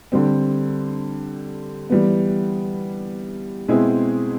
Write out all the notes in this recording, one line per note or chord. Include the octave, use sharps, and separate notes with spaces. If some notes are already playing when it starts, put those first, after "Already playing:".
D3 G3 C4
E3 G3 B3
B2 G#3 C4 E4 G#4